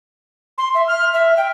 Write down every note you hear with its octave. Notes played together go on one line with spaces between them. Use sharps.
C6
E5
F6
E5
G5